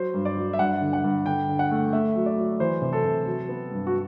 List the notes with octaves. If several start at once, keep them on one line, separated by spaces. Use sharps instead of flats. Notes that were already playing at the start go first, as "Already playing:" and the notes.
Already playing: F#3 C5
G2
D5
F#3
E5
G2 F#5
D3
F#5
G2
D3 G5
D3
F#5
A3
A3 E5
F#3
D5
F#3
E3 C5
C3
A4
C3
F#3
B3
G2
F#4